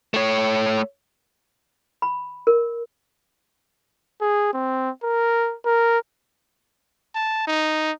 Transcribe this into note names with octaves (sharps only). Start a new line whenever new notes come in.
A3 C#5
B5
A#4
G#4
C4
A#4
A#4
A5
D#4